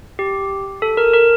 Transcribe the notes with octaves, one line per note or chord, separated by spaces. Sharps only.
G4
A4
A#4
A#4